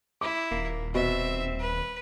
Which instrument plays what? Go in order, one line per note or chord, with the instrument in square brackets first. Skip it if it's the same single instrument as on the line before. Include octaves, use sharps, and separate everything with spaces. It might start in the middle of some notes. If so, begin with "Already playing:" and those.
[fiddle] E4 [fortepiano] D6
[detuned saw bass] D#1 [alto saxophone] A#3
[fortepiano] B2 [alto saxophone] C4 [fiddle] E5
[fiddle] B4